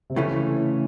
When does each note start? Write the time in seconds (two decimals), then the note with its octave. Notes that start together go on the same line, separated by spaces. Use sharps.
0.10 C3
0.16 A2 C#3 E3 A3 C#4